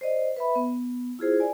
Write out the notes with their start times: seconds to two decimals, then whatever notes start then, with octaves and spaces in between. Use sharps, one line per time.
0.01 C5 D5 D#5
0.37 B4 E5 B5
0.55 B3
1.19 E4 F4 G#4 C5
1.40 D5 G#5